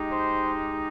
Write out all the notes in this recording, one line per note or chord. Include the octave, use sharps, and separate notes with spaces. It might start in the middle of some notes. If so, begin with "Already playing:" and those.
Already playing: G#3 D#4 G4
C5